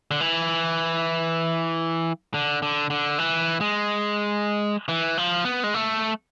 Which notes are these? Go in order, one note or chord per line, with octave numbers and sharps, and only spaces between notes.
D3
E3
D3
D3
D3
E3
G#3
E3
F3
B3
G#3
A3